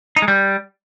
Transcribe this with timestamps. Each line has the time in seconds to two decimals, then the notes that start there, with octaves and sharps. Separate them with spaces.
0.16 D#4
0.22 G#3
0.28 G3